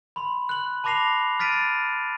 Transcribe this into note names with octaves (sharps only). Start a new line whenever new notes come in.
B5 C6
F#6 F#7
A5 B5 D6 A#6 C7 F7
F6 A6 B6 D7 D#7